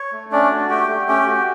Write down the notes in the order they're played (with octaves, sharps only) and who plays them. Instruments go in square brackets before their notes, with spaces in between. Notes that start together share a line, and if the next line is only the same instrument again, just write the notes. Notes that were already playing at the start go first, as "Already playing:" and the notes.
Already playing: [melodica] C#5
A3
C#4 D4 D5
F#4
A3 G4 G5
A3
C#4 G4 G5
F#4